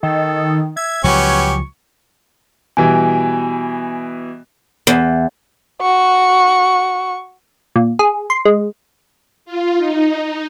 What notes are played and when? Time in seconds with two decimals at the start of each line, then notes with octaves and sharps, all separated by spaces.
0.03 D#3 A4
0.77 E5 G#6
1.04 C#2 F3 F#3 B3 C#4 G4 C#6
2.77 B2 E3 G3 G#5
4.87 E2
5.82 F#4 C#6
7.76 A#2
7.99 G#4
8.30 C6
8.45 G#3
9.45 F4
9.77 D#4